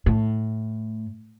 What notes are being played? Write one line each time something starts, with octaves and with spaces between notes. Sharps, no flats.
A2